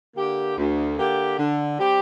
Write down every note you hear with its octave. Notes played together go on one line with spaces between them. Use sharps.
D3 A#3 G4
D2
D3 A#3 G4
D3
G3 C4 G4